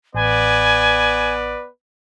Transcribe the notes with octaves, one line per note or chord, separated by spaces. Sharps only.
A1 B3 B4 D5 G#5